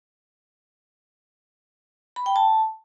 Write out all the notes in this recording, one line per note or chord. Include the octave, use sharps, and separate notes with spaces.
B5
G5
A5